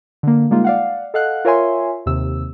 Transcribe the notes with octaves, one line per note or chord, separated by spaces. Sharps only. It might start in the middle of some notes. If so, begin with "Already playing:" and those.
D3 A#3
G3 G#3 A#3 D#4 F4
D5 F5 F#5
A4 D#5 F5 F#5 F#6
F4 A#4 C#5 E5 G#5 C6
D#2 C3 E6